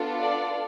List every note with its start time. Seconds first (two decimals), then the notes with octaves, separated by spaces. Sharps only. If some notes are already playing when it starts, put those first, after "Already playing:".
Already playing: B3 D4 F4 A4
0.19 D5